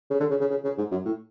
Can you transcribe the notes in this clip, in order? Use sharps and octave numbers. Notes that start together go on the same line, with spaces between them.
C#3
D3
C#3
C#3
C#3
C#3
G#2
F#2
A2